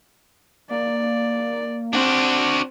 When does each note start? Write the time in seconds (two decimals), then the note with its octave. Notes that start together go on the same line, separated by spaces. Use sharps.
0.70 A#3 D5
1.93 C4 D4 F#4